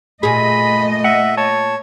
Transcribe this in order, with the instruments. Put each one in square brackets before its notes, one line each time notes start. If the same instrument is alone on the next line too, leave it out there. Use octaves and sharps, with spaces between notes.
[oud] A#2 G#4 [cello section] A3 D#5 [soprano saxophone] B5
[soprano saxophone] E5 [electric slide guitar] F#5
[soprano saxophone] C#5 [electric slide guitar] A5